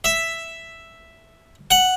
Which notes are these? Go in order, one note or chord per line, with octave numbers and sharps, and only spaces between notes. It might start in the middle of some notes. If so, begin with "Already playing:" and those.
E5
F#5